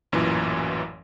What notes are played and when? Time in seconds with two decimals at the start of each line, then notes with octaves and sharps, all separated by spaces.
0.12 A1 F#2 A#2 E3